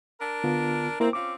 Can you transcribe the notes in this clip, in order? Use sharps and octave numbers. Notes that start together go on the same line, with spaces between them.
D4 A#4
D3 B3 F4
A#3 C4 E4 A#4
C4 C#4 F4 D6